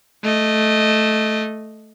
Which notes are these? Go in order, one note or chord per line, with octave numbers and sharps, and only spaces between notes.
A3 D#5